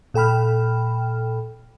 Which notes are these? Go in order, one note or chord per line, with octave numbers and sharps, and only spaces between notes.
A#2 A4 G5 B5 F6